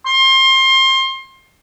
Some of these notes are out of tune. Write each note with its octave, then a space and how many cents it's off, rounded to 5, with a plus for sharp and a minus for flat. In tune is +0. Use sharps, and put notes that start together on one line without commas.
C6 +25